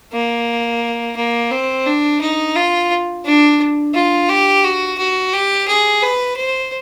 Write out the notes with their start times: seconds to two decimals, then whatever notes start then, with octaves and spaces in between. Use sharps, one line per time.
0.13 A#3
1.16 A#3
1.51 C4
1.86 D4
2.21 D#4
2.56 F4
3.25 D4
3.94 F4
4.29 G4
4.64 F#4
4.98 F#4
5.33 G4
5.68 G#4
6.02 B4
6.37 C5